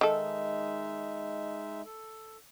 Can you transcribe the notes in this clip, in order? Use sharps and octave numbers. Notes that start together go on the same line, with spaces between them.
D#3 G#3 D#4 A4 E5
A4